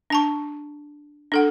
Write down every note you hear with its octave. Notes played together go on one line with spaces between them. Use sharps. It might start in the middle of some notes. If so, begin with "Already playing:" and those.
D4 A5 C#6
D4 A4 F#5